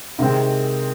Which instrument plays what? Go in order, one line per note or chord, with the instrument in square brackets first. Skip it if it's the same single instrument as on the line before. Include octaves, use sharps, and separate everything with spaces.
[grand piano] C3 D#3 G#3 C4